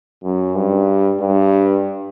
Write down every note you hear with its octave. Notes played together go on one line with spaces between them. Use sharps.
F#2
G2
G2